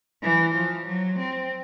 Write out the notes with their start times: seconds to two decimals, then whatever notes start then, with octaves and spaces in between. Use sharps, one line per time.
0.23 E3
0.55 F3
0.87 F#3
1.19 C4